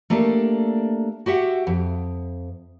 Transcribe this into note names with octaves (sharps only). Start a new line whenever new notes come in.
A3 A#3 D4 G4 A4
F#4 G4 E5 F#5
F2